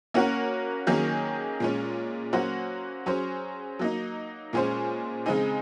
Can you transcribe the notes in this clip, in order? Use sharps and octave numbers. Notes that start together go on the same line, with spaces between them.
A#3 C#4 F#4 A#4
D#3 F#3 A#3 C#4 G#4
A#2 G#3 C#4
F#3 A#3 C#4 F#4 C5
F#3 C#4 G#4 C5
F#3 A#3 D#4
A#2 G#3 C#4 G#4 C5
C#3 G#3 C4 D#4 G#4